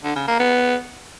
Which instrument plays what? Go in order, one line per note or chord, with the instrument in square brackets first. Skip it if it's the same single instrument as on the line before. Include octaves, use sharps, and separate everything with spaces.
[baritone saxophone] D3
C#3
A#3
B3